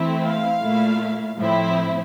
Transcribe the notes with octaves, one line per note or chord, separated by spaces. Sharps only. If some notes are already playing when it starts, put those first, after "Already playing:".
Already playing: E3 A3 C4 E4
F5
A#2 A3 E4
A2 F3 C4 E4